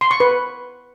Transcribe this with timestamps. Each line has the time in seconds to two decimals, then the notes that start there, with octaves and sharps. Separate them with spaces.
0.01 C6
0.11 C#6
0.20 B4